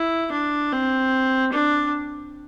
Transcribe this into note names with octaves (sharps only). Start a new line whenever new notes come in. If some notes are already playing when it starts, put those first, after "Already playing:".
Already playing: E4
D4
C4
D4